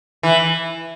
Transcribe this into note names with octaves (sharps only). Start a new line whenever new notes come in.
E3